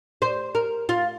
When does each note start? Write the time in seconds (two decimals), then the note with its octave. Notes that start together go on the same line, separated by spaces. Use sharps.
0.22 C5
0.55 A#4
0.89 F4